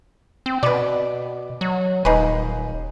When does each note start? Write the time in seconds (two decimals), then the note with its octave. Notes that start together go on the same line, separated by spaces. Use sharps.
0.46 C4
0.63 B2 B4 D5
1.61 F#3
2.05 D#1 D#4 G#4 B4